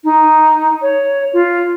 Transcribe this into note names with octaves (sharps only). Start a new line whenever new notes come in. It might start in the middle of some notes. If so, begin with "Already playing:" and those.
D#4
C#5
F4